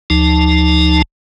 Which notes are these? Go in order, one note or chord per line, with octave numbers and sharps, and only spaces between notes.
D2 F3 D#4 A5